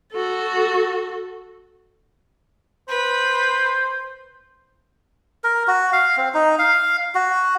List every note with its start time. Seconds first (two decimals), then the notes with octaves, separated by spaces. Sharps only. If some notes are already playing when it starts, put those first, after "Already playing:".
0.12 F#4 A4
2.89 B4 C5
5.44 A#4
5.67 F#4
5.93 F5
6.17 C4
6.34 D#4
6.59 F5
7.15 F#4